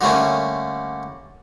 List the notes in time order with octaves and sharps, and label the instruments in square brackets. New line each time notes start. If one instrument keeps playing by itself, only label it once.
[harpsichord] D3 G3 A3 A#3 C#4